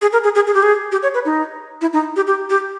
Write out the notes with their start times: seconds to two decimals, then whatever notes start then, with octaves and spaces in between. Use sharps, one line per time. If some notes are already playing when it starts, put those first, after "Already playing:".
0.02 G#4
0.13 A#4
0.24 G#4
0.35 G#4
0.47 G#4
0.54 G4
0.63 G#4
0.92 G4
1.03 C#5
1.14 B4
1.25 D#4
1.81 E4
1.93 D#4
2.16 G4
2.27 G4
2.50 G4